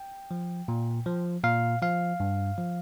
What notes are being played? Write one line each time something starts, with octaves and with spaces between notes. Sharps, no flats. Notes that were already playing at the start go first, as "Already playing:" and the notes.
Already playing: G5
F3
A#2
F3
A#2 F5
F3 F5
G2
F3